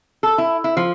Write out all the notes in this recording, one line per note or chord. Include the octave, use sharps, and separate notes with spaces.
A4
E4
E4
F3